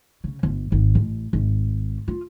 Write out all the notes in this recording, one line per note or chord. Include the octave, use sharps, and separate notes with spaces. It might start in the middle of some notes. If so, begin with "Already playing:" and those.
C#3
G1
G#1
A1
G#1
F4